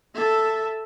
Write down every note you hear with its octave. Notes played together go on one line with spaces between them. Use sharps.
A4 E5